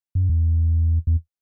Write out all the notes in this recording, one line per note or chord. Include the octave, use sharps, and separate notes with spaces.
F#2
E2
E2